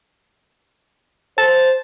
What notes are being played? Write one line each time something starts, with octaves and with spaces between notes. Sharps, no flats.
C5 A5